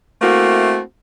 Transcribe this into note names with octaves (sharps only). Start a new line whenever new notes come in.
A3 A#3 C4 E4 F#4